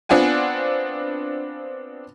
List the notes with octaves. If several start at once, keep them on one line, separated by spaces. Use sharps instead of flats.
B3 C4 D4 F4 F#5 G#5